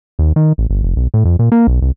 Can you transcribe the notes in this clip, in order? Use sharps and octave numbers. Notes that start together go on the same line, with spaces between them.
D#2
D#3
A1
G1
F1
B1
A2
F2
A#2
A#3
B1
C2